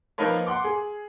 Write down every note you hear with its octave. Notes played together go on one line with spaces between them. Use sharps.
F3 A#3 D#4 A#4 B4 C#5
F#5 C6 D6
G#4